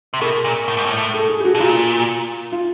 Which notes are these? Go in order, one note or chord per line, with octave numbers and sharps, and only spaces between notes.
C3
B2 A#4
A#2
A2
G#2
A2
A4
G#4
G4
F#4
B2
A#2 F4
F4